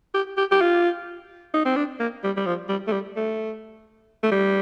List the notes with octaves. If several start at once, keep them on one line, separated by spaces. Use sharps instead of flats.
G4
G4
G4
F4
D#4
C4
D4
A#3
G3
G3
F3
G3
A3
G3
A3
A3
G3